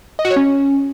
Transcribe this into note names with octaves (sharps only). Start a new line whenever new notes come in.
D#5
F#4
C#5
C#4